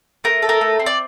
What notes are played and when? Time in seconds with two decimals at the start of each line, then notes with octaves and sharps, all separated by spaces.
0.24 A3 A#4
0.42 A4
0.49 A#4
0.61 A3
0.79 C4
0.86 D5